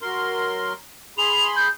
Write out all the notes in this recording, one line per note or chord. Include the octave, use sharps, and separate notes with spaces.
F#3 A#4 C6
G#4 B5 C6 F7
G6